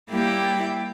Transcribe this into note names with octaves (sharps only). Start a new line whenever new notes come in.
G3 A#3 E4 G4 G5